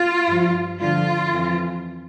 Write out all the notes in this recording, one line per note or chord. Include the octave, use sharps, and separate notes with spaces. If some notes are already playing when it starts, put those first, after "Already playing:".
Already playing: F4
G2 F3
G2 D3 F3 F4
F2 E3